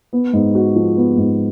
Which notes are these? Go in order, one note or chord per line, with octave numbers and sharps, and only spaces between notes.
B3
G#2
F#4
F3
B3
G#2